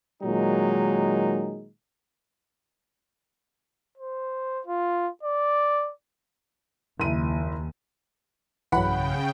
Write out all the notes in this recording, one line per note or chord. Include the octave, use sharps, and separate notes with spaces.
A#2 D#3 F#3 G#3 D#4
C5
F4
D5
F#1 D#2 E4 D#7
B1 G2 C#3 E3 F#3 F#5 G5 B5